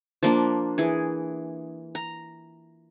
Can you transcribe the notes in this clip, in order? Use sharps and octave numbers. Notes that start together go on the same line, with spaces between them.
F3 A#3 D4
E3 G#4
A#5